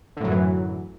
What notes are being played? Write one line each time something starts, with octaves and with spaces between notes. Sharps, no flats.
F#2 A2 D3 E3 F#3